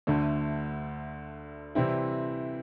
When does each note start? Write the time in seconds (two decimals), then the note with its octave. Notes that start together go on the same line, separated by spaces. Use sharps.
0.07 D2 D3 A3
1.75 C3 E3 G3 C4 E4